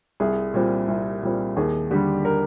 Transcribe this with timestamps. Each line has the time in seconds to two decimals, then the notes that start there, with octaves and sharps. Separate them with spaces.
0.20 C2 G#4
0.54 A#2 G3 C4
0.88 C2
1.22 A#2 G3 C4
1.56 D#2 G#4
1.91 D3 G3 G4
2.25 A#4